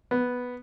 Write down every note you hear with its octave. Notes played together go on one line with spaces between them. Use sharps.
B3